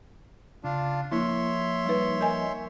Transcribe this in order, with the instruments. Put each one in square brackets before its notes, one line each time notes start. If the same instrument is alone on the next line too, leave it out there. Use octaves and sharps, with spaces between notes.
[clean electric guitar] C#3 [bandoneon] D4 F4
[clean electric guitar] F3 A#3 F4 [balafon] E4 [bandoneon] C#5 E5 C6
[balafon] G3 D#4 B4
A#4 D#5 G#5